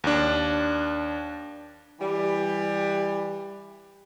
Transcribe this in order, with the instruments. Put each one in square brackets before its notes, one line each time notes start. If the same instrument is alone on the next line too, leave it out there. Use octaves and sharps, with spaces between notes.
[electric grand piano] D#2 D4
[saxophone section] E3 G3